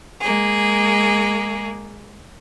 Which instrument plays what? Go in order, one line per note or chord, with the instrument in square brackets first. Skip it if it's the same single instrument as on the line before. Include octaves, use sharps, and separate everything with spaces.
[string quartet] G#3 A#3 G#4